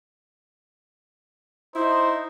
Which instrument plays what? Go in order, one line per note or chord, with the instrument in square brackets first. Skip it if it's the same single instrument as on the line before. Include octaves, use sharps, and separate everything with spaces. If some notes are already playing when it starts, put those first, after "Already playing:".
[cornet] D#4 [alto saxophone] E4 [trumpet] C5